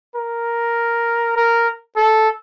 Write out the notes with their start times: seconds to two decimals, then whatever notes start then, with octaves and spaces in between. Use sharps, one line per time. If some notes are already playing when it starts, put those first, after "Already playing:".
0.15 A#4
1.36 A#4
1.96 A4